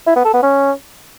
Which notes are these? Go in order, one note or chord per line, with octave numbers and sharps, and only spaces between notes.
E4
B3
A4
B3
C#4